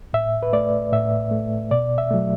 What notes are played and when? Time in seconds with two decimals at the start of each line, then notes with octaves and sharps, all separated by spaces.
0.13 A2 E5
0.43 B4
0.53 A3 D5
0.92 A2 E5
1.31 A3
1.71 B2 D5
1.98 E5
2.10 F#3 A3